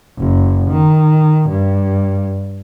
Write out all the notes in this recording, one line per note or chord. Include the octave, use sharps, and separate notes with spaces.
F#1
D#3
G2